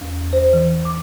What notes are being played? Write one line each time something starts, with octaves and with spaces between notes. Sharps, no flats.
E2
C5
E3
D6